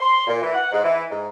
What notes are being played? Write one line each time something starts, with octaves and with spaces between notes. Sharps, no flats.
C6
A#2
E3
F#5
G#2
E3
G#2